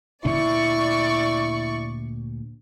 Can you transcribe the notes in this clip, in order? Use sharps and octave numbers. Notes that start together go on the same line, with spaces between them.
D2 A#2 D4 E4 D5 C#6